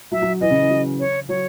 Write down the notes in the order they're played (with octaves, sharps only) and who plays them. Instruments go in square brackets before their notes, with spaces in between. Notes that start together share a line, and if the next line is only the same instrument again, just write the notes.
[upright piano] F#3 [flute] E5
[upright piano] F#3
[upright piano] E3 [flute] D#5
[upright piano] C#3
E3
F#3
[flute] C#5
[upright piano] F#3 [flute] C#5